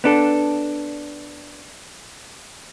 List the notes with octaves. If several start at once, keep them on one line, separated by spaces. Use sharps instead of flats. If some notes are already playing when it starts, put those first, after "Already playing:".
B3 D4 A4